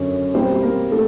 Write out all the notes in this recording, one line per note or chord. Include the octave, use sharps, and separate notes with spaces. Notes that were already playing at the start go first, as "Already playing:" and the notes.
Already playing: F#2 D3 F#3 C#4 C#5
B2 G3 A#3 C4 C5
A#3 A#4
A3 A4